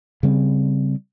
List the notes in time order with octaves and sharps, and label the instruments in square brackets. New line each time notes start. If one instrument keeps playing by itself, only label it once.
[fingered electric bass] C#3 G3 C4